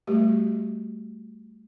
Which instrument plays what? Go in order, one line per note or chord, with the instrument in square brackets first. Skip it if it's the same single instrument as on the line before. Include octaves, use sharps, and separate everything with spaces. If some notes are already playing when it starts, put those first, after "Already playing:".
[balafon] G3 A3 F#4 G4